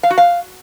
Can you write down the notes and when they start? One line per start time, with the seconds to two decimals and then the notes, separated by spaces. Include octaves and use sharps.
0.03 F5
0.10 F#4
0.18 F5